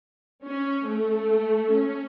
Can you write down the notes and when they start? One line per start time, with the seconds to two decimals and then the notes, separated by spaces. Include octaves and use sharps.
0.44 C#4
0.88 A3
1.75 C#4